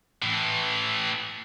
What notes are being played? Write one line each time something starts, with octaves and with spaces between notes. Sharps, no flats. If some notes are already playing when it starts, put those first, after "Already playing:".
A2 E3